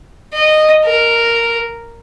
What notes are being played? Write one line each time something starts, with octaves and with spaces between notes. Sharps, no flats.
D#5
A#4